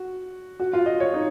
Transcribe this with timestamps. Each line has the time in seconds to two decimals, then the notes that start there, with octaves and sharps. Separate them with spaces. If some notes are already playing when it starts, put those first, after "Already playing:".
Already playing: F#4
0.60 F#4
0.73 F4
0.86 D#5
1.00 C#5
1.14 D#4